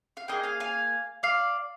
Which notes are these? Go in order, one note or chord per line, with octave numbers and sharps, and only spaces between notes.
F5
A#3 D#4 G#4 D#5 G5
F5 G#5
F5 G#5
D5 F5